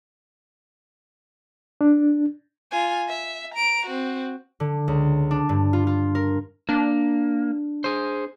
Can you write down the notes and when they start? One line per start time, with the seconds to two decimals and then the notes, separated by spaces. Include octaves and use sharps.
1.81 D4
2.71 F4 G#5
3.08 E5
3.54 A#5 D7
3.86 C4 F#4
4.60 D3
4.88 C#2
5.31 D4
5.49 G2
5.73 F4
5.87 F4
6.15 A#4
6.69 A#3 D4
7.84 G#4 C5